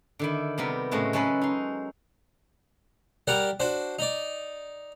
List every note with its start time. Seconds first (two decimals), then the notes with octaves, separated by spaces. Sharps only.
0.19 D3 D#3 E4
0.58 C3 G3 B3 A#4
0.91 A2 C#3 G#3 A3 C4 F#4
1.13 F#3 G#3 C#4 A4 B4
1.41 D#4 C6
3.27 G3 G4 A#4 D5 F#5
3.60 D4 F#4 C5
3.99 D#4 D5